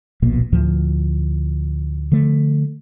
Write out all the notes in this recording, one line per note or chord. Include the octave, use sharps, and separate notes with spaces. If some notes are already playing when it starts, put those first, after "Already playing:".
D1 A#1 B2 A#3
D2 A2 F3
D3 F3 A3